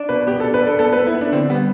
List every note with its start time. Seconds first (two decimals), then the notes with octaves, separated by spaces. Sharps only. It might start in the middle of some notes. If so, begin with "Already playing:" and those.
Already playing: D4
0.09 B2 B4
0.27 B3 G4
0.40 A4
0.44 D4
0.54 B4
0.62 D4
0.67 A4
0.79 B3 A4
0.93 B4
0.97 B3
1.07 E4
1.15 B3
1.21 D4
1.32 D3 C4
1.50 G3 B3